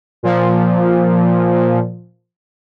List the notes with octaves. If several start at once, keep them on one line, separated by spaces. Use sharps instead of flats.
A#2 F3